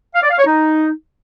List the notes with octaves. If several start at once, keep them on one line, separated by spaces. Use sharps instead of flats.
F5
D5
F5
C#5
D#4